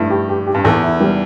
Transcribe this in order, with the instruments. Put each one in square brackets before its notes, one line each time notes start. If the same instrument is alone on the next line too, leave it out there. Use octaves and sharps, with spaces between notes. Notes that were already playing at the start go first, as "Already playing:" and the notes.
Already playing: [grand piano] G2 [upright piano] A3 E4
[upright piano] G4
G4
G4
[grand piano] G2
[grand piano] E2 [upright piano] A4
[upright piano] E4
G3